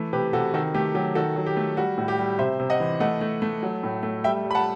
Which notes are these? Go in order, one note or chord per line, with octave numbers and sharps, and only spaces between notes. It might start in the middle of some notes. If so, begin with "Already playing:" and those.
Already playing: E3 A3
C3 G4 B4
C3 F#4 A4
D#3 F#4 A4
A3 G4
F#3 G4
D#3 F#4 A4
F#3
G4
A3
G3 F#4
A2
G4
G3
C3 C5 E5
C3
D#5 F#5
E3
A3 D#5 F#5
A3
A3
F#3
A2
A3
G3 E5 G5
G3
B5
F#5 A5